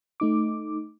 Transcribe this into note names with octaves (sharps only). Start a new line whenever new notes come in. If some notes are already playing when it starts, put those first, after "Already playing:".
A3 D#4 D6